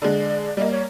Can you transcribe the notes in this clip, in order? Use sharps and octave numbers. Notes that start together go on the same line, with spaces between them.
D3 G#3 D5
G3 A#3 D#5
C#5